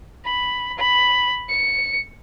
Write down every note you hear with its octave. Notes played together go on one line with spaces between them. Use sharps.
B5
B5
C#7